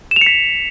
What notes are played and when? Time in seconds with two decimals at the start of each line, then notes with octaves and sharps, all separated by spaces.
0.11 E7
0.16 F7
0.21 C#7
0.26 B6